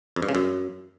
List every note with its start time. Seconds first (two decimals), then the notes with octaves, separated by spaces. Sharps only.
0.16 F2
0.22 G2
0.29 C#3
0.35 F#2